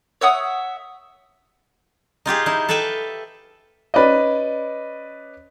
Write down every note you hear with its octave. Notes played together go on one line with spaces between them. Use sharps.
C#5 E5 F#5 D#6
D#4 F4 G4 G#4
D#4 E4
A4 B4 E5 F5 G5
C#4 B4 D5 D#5